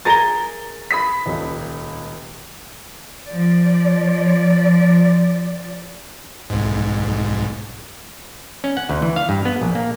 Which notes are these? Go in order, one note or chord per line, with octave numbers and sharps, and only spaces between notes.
G#4 A#4 A#5 A6 G7
B5 D#6 B6
D#1 C#2
F3 D5
B1 G#2
C#4
F#5
D2
E3
F5
G2
B3
A#1
A#3